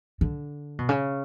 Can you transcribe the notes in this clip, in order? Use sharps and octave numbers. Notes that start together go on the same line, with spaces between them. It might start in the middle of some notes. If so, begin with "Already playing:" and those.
D3
B2
C#3